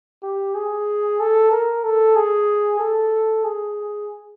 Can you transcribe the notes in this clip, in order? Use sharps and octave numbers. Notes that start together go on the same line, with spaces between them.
G4
G#4
A4
A#4
A4
G#4
A4
G#4